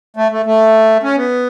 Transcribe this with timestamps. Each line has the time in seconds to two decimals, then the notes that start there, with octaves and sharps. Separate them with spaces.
0.16 A3
0.32 A3
0.46 A3
1.03 C#4
1.17 B3